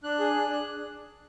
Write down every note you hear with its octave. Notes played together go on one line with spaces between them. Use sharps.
D4 F#6
G#4
D4
D4